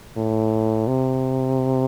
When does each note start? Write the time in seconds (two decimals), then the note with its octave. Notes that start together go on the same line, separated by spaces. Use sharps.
0.17 A2
0.88 C3